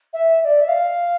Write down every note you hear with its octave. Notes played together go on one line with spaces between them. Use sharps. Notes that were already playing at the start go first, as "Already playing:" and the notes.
E5
E5
D5
E5
F5